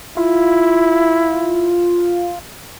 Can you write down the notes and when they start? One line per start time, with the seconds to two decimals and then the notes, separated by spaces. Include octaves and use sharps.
0.17 E4 F4